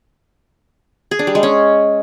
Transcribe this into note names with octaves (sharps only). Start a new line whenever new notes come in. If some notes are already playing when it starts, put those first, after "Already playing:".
G#4
D4
G3
G#3
C#4